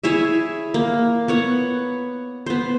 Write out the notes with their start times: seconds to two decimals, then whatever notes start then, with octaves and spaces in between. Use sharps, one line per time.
0.04 E4 G#4 C#5 E5
0.74 A#3
1.28 B3 C#5 F#5
2.46 B3 C5